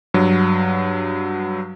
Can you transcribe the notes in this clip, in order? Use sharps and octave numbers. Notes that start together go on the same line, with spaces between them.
G2 F#3